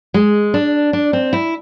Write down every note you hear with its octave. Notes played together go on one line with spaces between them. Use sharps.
G#3
D4
D4
C4
E4